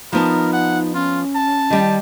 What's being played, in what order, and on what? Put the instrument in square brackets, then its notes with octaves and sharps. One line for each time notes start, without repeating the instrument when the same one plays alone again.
[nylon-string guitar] F3 B3 A5 [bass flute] D#4 [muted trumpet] A#4
[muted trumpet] F#5
[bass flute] C#4 [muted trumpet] F4
[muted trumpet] A5
[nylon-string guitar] D#3 G3